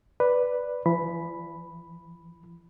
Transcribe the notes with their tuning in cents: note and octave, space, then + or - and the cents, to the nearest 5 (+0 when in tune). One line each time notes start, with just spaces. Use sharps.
B4 +0 D5 +0
E3 +45 B5 +0